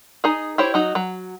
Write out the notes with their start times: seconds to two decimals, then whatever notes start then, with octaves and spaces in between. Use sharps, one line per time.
0.24 D#4 G#4
0.58 E4 G4 C5 C#5
0.74 F#3 D#4 F#4
0.95 F#3